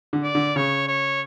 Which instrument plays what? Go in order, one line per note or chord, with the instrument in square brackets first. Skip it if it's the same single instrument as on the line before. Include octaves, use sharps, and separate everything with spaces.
[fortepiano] D3
[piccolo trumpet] D5
[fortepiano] D3
[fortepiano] C#3 [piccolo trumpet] C#5
[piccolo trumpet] C#5